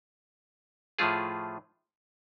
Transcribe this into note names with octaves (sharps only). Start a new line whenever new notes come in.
A2 F3 A3 F4 G#4